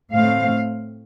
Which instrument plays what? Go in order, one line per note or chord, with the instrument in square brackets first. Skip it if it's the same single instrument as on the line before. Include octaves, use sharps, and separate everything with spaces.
[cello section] A2 A3 C4 F5